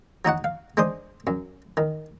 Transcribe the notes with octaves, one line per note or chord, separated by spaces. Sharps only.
F#3 D#4 F#4 F#5
F5
G#3 D4 C5 D#6
F#2
D#3